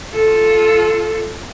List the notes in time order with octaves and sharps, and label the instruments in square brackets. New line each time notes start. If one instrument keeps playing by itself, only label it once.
[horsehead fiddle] F4 A4